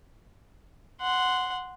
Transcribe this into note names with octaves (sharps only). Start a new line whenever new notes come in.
F#5 C6